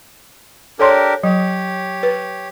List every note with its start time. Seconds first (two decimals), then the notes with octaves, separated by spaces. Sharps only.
0.79 D4 G4 A4 A#4 C#5 C6
1.23 F#3 G4 C#5
2.03 B4